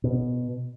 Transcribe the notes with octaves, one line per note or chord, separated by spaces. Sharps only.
B2